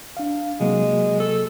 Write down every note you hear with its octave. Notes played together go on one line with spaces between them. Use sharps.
D4 F5
C3 F#3 G#3 A#3
A4